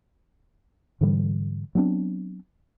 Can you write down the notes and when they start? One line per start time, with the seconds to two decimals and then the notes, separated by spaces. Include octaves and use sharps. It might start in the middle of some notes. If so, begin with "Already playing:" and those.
1.01 G#2 D3 E3 G3
1.75 F#3 B3 C4 D4